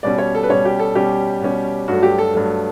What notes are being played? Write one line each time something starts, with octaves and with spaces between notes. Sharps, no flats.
B2 G3 C#4 D5
C#5
A4
B4
B2 G3 C#4 C#5
G4
A4
B2 G3 C#4 G4
B2 G3 C#4
G2 F#3 A3 F#4
G4
A4
G2 F#3 A3